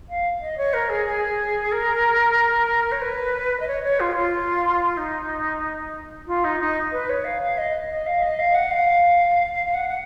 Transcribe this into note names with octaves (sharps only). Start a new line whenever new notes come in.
F5
D#5
C#5
A#4
G#4
G#4
A#4
C#5
B4
D#5
C#5
C#5
F4
F4
D#4
F4
D#4
D#4
B4
C#5
F5
F5
D#5
D#5
F5
D#5
F5
F#5
F5
F5
F5
F#5
F#5